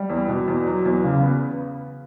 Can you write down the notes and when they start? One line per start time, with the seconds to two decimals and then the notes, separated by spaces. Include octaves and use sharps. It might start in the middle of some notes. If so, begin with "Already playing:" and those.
Already playing: G3
0.10 E2
0.28 B2
0.48 E2
0.67 F#3
0.86 E2
1.04 C#3
1.23 B3